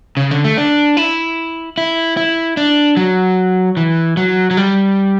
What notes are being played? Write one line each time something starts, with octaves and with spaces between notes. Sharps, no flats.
C#3
D3
A3
D4
E4
E4
E4
D4
F#3
E3
F#3
F#3
G3